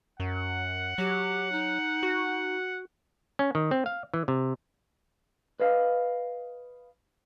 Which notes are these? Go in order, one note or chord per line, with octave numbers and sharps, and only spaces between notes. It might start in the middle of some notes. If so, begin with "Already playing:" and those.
F#2 F#5
F#3 G4
D#4
F#4
C#4
D#3
C4
F5
E3
C3
B4 D#5 F5